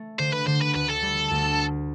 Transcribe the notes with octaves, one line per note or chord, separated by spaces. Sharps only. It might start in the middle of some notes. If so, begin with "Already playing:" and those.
Already playing: A3
D3 C5
B4
D3 C5
B4
D2 B4
A4
G3
D2